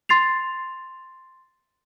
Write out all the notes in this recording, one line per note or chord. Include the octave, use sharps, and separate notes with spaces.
C6 A6 C7 F7